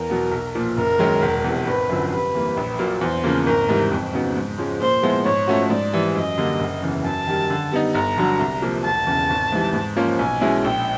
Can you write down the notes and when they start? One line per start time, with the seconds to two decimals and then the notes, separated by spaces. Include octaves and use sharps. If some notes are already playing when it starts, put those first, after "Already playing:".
Already playing: E2 A#4
0.10 B2 F#3 B3
0.31 B1
0.55 A#2 F3
0.77 F#1 A#4
0.99 F#2 D#3 G#3 C#4
1.22 E1
1.44 E2 C3
1.67 G#1 B4
1.89 F#2 D3 F3
2.12 C3 B4
2.34 E3 G3 A#3
2.57 A#1
2.79 A#2 F#3 A#3
3.01 E2 C5
3.24 C#3 F3 A#3
3.46 G#1 A#4
3.69 G#2 E3 G3
3.92 F2
4.13 C#3 F#3 B3 D#4
4.36 G#2
4.58 F3 G#3 C#4
4.80 A#2 C5
5.03 F3 G#3 B3 E4
5.25 G#2 C#5
5.47 F3 A3 C#4 F#4
5.70 G#2 D5
5.93 E3 G3
6.15 F#2 D#5
6.38 D3 G3 A#3 D4
6.60 F#1
6.82 E2 C#3 E3
7.04 F#2 A5
7.27 D#3 G3
7.50 D3
7.72 G3 B3 D#4
7.94 G1 A#5
8.17 G2 D3 F#3
8.39 C2
8.62 C3 F3 A#3
8.84 E1 A5
9.07 E2 C#3
9.30 G#1
9.52 G#2 E3 G3
9.74 G#2
9.96 F3 A#3 C#4 F4
10.19 B1 G#5
10.41 B2 G#3 C#4 E4
10.64 A#1 G5